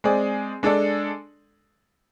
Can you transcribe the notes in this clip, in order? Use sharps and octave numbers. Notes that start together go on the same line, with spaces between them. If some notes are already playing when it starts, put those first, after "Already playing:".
G#3 C4 G#4 D5
G#3 D4 A4 D5